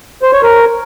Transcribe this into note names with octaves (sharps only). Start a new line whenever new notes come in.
C5
C#5
A#4